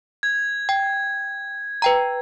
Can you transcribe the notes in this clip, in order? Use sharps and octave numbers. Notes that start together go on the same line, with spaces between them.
G#6
G5
B4 G5 A#5